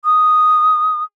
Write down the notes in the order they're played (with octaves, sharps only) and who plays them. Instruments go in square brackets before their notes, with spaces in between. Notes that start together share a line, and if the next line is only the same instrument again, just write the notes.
[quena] D#6